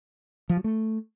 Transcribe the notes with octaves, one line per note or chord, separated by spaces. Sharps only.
F3
F#3
A3